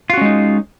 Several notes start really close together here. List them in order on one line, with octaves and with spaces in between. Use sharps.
F4 F#4 C#4 G#3 D#4